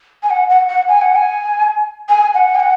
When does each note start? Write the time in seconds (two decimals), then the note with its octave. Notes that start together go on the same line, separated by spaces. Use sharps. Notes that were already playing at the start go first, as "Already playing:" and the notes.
0.23 G#5
0.30 F#5
0.50 F#5
0.68 F#5
0.88 G#5
1.02 F#5
1.16 G#5
2.09 G#5
2.35 F#5
2.55 G#5
2.60 F#5